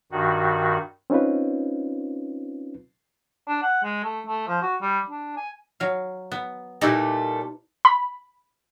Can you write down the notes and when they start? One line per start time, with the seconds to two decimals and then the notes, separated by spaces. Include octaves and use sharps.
0.12 G2 D#3 F#4
1.10 C4 C#4 D#4 F4 B4
3.48 D4
3.62 F#5
3.84 G#3
4.04 A3
4.27 A3
4.48 F3
4.62 F#4
4.82 G3
5.10 D4
5.37 G#5
5.80 F#3 F5
6.32 B3
6.81 A#2 G3 A3 D#4 E4 B4
7.85 B5